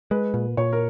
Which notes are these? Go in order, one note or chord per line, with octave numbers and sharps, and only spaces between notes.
G#3 B4
A#2
A#2 C#5
A#4